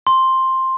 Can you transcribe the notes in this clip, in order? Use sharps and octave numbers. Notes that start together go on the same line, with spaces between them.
C6